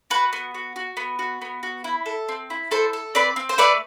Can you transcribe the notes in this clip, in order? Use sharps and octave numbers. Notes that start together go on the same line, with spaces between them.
F#4 B4
B3
F#4
F#4
B3
F#4
B3
F#4
E4
A4
C4
E4
E4 A4 C5
A4
C4 B4 D5
C4
C5
A3 B4 D5